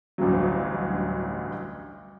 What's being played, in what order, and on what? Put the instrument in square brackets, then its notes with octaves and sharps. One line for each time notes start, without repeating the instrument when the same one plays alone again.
[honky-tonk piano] A1 D2 G2 F#3